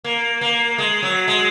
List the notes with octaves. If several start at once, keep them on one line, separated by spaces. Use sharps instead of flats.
A#3
A#3
G#3
F#3
G#3